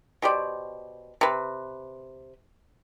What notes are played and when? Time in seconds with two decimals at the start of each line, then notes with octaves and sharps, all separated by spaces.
0.22 B2 G4 C5 D5
1.21 C3 B4